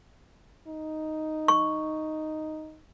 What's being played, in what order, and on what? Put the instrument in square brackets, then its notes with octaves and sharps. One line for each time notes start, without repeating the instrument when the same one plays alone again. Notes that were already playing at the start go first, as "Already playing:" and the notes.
[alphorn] D#4
[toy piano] C#6